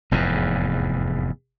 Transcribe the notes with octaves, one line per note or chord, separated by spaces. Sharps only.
F1 E2 G#2